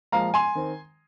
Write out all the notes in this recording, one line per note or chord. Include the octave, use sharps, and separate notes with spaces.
A#2 F3 G#3 F5 A#5
G#5 C6
D#3 C4